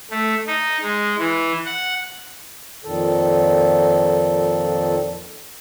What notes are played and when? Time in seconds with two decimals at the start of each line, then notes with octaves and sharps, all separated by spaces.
0.11 A3
0.47 D#4
0.83 G#3
1.19 E3
1.66 F#5
2.84 F2 A#2 D#3 A4